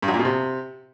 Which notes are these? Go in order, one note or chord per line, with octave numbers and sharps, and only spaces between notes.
G2
F#2
A#2
B2
C3